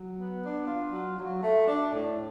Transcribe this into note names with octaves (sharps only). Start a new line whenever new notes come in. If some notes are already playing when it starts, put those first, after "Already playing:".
Already playing: F#3
B3
D4
F4
F#3
F#3
A3
D4
A2